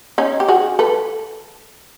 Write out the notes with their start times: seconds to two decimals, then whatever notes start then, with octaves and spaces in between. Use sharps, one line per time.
0.18 C#4 D#4
0.40 G4
0.48 F#4 G#4
0.79 A4 B4